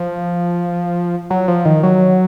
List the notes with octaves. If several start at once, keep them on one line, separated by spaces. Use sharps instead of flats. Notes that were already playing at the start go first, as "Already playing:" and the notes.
Already playing: F3
F#3
F3
D#3
F#3